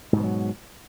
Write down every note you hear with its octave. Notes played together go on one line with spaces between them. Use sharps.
G#2 B2 F3 F#3